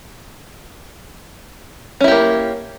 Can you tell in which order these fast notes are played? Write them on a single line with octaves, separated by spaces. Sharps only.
C#4 E4 G4 A#3